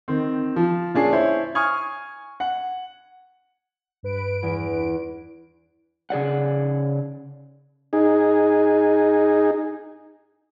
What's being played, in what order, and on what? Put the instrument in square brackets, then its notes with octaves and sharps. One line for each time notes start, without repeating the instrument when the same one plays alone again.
[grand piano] D#3 C4
F3
A#2 C#4 D4 G#4 A5 C7
E4 C5 C#5
G#5 C#6 D#6 F6 G#6
F#5
[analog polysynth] G2 B4 D7
[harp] E2
[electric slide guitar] C#3 G#4 D5 F#5
[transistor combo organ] D#4 G#4